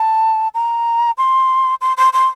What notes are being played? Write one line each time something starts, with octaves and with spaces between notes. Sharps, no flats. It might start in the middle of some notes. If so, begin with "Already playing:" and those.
Already playing: A5
A#5
C6
C6
C6
C6